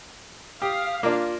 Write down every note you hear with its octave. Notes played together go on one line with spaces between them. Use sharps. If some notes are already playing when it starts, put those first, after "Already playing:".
G4 F5 D#6
A#3 D4 F4